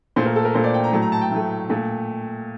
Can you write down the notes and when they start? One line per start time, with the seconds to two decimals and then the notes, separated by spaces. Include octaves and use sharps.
0.16 A#2 A3 C5
0.26 A#4
0.36 A4
0.45 A#4
0.54 A#2 A3 C5
0.64 D5
0.74 G5
0.84 A#5
0.93 A2 F#3 A3 A5
1.02 A#5
1.12 A5
1.21 G5
1.31 A2 F#3 A3
1.69 A#2 A3